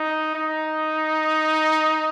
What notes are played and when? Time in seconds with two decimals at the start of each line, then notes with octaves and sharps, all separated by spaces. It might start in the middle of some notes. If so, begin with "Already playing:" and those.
Already playing: D#4
0.35 D#4